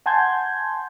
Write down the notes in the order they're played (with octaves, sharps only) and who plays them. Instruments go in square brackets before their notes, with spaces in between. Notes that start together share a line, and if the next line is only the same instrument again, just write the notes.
[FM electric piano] F#5 G#5 A5 C6 G6 G#6